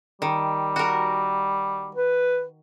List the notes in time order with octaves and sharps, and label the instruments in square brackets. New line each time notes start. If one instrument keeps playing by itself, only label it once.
[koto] D#3 [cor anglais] G3
[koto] F#4 A#4
[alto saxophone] B4